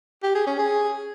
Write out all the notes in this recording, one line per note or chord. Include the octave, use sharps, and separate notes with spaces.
G4
G#4
C#4
G#4